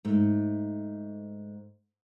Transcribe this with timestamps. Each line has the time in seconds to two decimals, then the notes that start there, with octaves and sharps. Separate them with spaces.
0.05 G#2 A3